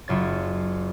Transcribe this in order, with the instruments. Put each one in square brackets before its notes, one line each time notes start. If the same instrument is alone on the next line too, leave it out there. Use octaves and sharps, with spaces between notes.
[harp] F#1 F4 C#5 A6